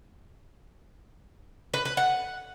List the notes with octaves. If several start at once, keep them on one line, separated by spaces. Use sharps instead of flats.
B4
B4
F#5